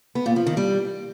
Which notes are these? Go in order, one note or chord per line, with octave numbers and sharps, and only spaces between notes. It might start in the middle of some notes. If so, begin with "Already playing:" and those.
B3
A#2
F3
D#3
G3